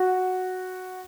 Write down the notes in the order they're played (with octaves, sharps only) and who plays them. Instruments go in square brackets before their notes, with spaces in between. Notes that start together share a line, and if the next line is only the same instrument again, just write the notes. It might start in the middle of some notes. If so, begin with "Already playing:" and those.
Already playing: [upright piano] F#4